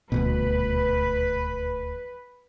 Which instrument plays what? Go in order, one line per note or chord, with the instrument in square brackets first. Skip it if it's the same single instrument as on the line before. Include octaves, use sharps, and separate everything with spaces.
[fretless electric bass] D#1 D2 B2 [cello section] B4